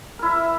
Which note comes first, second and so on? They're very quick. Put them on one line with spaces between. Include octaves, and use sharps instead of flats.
A#4 E4 E5